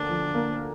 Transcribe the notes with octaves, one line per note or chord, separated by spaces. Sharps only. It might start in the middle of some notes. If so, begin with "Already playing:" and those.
Already playing: D2 D3 A#3 D4
F3
A#3